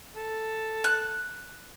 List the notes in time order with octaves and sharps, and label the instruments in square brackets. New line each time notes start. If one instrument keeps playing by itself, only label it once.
[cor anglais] A4
[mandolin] F#6